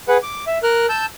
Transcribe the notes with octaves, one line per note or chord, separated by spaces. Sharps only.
G#4 B4 F#5
D6
E5
A#4 F6 F#6
A5 E6 G6